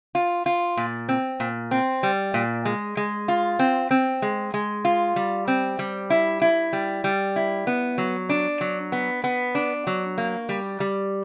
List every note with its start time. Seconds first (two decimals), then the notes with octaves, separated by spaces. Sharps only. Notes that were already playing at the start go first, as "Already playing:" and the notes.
0.15 F4
0.46 F4
0.77 A#2
1.09 C4
1.40 A#2
1.71 C4
2.03 G3
2.34 A#2
2.65 G#3
2.97 G#3
3.28 F4
3.59 C4
3.91 C4
4.22 G#3
4.54 G#3
4.85 F4
5.16 G3
5.48 C4
5.79 G3
6.10 E4
6.41 E4
6.73 G3
7.04 G3
7.36 E4
7.67 B3
7.98 F#3
8.29 D4
8.61 F#3
8.92 B3
9.24 B3
9.55 D4
9.87 F#3
10.18 A#3
10.49 G3
10.80 G3